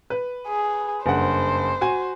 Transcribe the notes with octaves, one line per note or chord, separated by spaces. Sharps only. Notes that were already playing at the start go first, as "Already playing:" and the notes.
B4
G#4
F#1 G2 C5 F#5
F#4 G#5